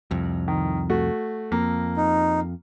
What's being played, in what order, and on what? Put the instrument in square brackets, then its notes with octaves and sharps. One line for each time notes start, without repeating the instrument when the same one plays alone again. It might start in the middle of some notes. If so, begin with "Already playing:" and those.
[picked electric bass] C2 F2
[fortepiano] D#3
A3 F#4
[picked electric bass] F2 [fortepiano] A#3
[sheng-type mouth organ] D#4